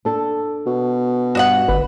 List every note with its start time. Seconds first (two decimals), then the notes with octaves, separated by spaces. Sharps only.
0.05 D4 A4
0.66 B2
1.35 G2 F#4 D#5 F#5
1.68 G1 B4